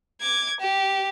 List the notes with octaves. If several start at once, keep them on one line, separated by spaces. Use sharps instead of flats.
D6 G#6
G4